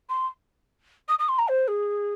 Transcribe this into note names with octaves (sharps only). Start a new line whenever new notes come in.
C6
D#6
D#6
C6
A#5
C5
G#4